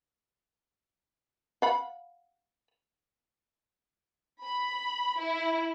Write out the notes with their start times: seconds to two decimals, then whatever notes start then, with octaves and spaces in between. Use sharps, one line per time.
1.62 F5 F#5 B5
4.44 B5
5.19 E4